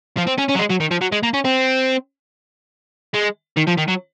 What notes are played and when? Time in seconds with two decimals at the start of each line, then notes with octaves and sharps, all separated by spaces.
0.17 F3
0.27 C4
0.38 C#4
0.49 C#4
0.55 F#3
0.59 G#3
0.70 F#3
0.80 D#3
0.91 F3
1.01 F#3
1.12 G#3
1.23 A#3
1.34 C#4
1.45 C4
3.14 G#3
3.57 D#3
3.67 F3
3.78 D#3
3.88 F#3